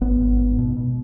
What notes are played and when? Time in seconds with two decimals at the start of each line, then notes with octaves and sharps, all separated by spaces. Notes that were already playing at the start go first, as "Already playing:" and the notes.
0.01 G#1 B3
0.20 G#1
0.39 G#2
0.58 B2
0.76 B2